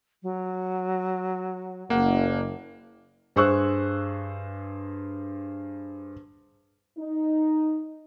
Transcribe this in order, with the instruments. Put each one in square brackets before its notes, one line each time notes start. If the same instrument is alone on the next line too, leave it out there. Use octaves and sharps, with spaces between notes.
[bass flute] F#3
[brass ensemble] F#1 [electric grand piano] A#3 F#5
[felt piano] G2 G#4 C5 C#6 E6 F#6
[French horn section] D#4